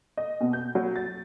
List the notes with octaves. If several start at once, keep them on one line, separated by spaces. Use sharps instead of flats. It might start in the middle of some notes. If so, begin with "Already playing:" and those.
D#5
B2
G6
F#3
A6